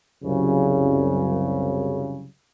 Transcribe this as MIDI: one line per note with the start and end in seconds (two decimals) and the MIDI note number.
0.24 2.27 36
0.24 2.27 42
0.24 2.27 49